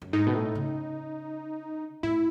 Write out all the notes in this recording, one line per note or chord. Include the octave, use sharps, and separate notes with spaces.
F#2
G#2 D#4
B2
A2
C#3
A2 E4